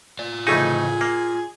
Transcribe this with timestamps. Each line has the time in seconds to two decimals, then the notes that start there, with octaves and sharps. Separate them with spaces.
0.19 F4 D5
0.47 F2 C#3 E3 A3 D#4 G#4
1.01 A#3 F5